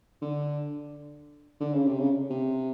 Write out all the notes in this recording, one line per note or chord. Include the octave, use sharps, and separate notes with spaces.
D3
D3
C#3
C3
C#3
C3